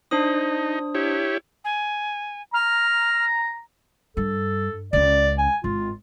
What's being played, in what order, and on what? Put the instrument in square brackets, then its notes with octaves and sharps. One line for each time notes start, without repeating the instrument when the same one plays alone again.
[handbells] D4 C5 D#6 [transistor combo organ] D#4
[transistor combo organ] E4 G4 C#5
[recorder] G#5
[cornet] A#5 [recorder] F6
[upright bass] G2 [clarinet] A4
[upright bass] C#2 C#4 [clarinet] D5
[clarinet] G#5
[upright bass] G#1 [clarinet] F4